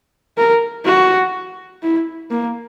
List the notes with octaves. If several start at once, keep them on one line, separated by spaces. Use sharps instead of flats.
A#4
F#4
E4
A#3